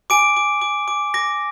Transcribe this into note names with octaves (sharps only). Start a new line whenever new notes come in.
G#5 D6 D7
D6
D6
D6
D6 A#6